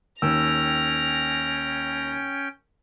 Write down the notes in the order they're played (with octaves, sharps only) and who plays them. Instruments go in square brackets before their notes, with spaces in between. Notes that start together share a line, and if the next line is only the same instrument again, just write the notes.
[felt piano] D#2 [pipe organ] C#4 G5 [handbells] E6 [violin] A#6 F7